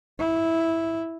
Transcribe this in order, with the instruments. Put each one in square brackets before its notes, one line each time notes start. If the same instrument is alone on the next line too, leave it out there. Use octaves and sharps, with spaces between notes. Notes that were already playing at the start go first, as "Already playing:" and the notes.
[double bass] E4